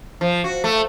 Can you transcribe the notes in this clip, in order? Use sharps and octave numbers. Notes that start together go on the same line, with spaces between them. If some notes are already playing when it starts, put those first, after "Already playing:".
F3
F#4
A3